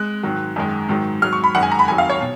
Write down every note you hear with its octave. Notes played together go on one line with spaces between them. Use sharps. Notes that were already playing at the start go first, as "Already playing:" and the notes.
Already playing: G#3 F#6
G#2 D#3 F#3
F#2 D#3 G#3
G#2 D#3 F#3
G#2 F#3 F6
C#6
B5
F#2 D#3 G#3 F#5
G#5
A#5
B5
F2 D#3 F#3 G#5
F5
C#5
B2